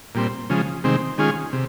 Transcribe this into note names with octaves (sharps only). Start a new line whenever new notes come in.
A#2 G3 C4
C#3 F3 G#3
C3 D#3 G#3 C4
D#3 G#3 C#4 F4 G#4
C3